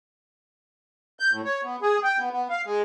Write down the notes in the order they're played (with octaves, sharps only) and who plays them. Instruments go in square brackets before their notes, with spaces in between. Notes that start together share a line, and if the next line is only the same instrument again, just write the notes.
[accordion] G6
A2
C#5
B3
G#4
G5
B3
B3
F5
G#3